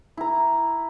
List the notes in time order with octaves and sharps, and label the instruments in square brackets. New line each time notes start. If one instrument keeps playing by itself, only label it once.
[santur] E4 A#5